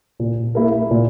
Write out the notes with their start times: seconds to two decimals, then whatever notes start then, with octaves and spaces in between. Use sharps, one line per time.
0.20 A#2
0.55 A#3 E4 A#4
0.91 A#2